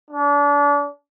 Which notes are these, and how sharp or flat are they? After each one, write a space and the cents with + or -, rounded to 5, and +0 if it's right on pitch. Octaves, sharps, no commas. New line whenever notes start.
D4 -35